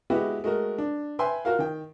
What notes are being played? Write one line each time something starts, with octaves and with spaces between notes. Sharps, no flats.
G#3 B3 E4 F#4 G4
G#3 A3 F#4 A#4
D4
B4 E5 G5 G#5 C6
F4 F#4 A#4 F5
D#3 G5